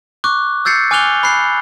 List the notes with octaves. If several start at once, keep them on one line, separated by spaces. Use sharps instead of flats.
C#6 D6 F#6
E6 G6 A6 C7 C#7
G#5 D6 F6 F#6 F7 G7
B5 F#6 C7